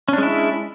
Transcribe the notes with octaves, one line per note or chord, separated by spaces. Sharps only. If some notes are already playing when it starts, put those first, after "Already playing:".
G#3 C#4 D4 E4